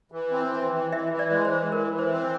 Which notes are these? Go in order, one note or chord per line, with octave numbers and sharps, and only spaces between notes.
E3
C4
E3
E3
E3 E5
E3
D5
G#3
C5
E3
E3 A#4
E3
C5
C4